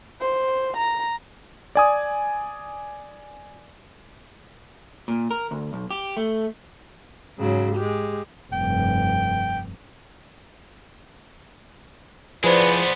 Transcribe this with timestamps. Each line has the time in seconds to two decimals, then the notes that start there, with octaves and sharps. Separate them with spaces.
0.21 C5
0.76 A#5
1.75 D5 G#5 D#6
5.08 A#2
5.31 A#4
5.51 D2
5.73 B1
5.91 G4
6.17 A3
7.38 G#2 C#3 F#3
7.75 G#3 G4
8.53 F1 G2 G5
12.44 F3 G#3 B3 E4 G#4 B4 C5 D5